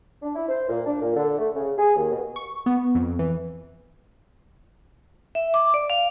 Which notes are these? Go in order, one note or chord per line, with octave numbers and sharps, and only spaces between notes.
D4
E4
C5
A#2
D4
A#2
D3
A3
C#3
G#4
D#2
B2
C#6
B3
F2
E3
E5
D6
D5
F5